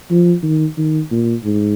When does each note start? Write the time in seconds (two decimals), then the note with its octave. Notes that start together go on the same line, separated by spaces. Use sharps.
0.10 F3
0.43 D#3
0.78 D#3
1.11 A#2
1.44 G#2